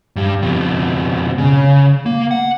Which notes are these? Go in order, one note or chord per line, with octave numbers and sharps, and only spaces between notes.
G2 G3
F2 B2
C#3
A#3
F#5